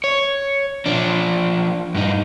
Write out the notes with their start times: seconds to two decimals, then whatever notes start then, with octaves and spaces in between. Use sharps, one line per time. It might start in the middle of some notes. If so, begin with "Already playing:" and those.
0.04 C#5
0.86 F3 D4
1.95 G2 D#4